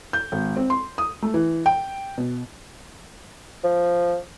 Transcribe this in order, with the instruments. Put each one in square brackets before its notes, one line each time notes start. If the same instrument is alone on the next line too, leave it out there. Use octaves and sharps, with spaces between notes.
[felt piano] G6
G#1
C4
C6
D#6
A3
E3
G5
B2
[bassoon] F3